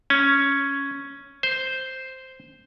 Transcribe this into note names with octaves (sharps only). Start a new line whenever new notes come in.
C#4
C5